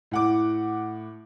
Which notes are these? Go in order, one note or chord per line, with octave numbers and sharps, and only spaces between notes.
A2 F#5 D6